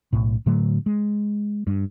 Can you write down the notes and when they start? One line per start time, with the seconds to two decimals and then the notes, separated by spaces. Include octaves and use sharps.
0.13 B1 A2
0.46 A2 D3 F#3 A3
0.86 G#3
1.67 G2